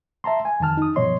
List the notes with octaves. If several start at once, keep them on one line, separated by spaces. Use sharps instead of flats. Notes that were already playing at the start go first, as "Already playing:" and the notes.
E5 A5 A#5 C6
G#5
F2 D#3 A5 F6
D#4 D#6
G2 B2 F3 C#5 D#5 C6